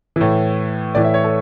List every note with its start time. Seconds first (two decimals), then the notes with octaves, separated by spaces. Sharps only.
0.16 A2 E3
0.95 A2 E3 D5
1.04 E5
1.14 C#5
1.24 A4